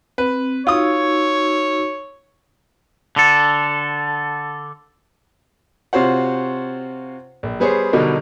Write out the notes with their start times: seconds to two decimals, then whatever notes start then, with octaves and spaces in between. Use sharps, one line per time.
0.18 C4 B4
0.67 D#4 F4 F#4 C#5 D#6 E6
3.16 D3 A4
5.93 C3 F4 F#4 C5 C#5 F#5
7.43 A#1
7.60 G3 B3 G#4 C5 C#5
7.93 B2 D3 F#3 G3 D#4 A#4